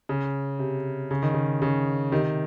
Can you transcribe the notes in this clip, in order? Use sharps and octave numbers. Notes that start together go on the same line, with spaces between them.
C#3
C3
C#3
D#3
C#3
C#3
C3 D#3